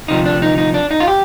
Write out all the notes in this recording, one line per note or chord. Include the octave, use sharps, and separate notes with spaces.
D2 C3 F3 D#4
D4
D#4
D#4
D4
D#4
F4
G4